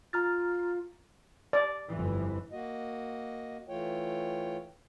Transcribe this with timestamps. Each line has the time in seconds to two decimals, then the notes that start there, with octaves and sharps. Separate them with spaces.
0.13 F4 A#5 F6 A6
1.53 D5
1.89 G1 F2 E3
2.52 A#3 F#4 D#5
3.69 E3 A3 F4 C#5 G5